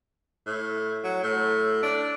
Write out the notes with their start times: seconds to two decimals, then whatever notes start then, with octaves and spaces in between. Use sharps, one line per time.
0.46 A2
1.04 F#3
1.23 A2
1.83 D4